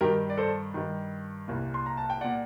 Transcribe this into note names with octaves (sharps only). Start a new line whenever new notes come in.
G2 D#3 G4 A#4
D5
A4 C5
G2 D#3
C2 A#2
C6
A#5
A5
G5
A#2 D5 F#5